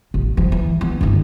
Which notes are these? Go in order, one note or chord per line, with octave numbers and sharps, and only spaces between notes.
A1
F3
E3
B3
G1 D#4